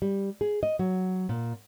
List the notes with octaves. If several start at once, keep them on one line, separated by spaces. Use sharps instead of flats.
G3
G#4
D#5
F#3
A#2